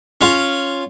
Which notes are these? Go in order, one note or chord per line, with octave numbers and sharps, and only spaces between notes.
C#4 F4